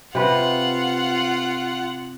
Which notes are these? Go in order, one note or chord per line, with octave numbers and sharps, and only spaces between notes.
C3 F4 B4 F#5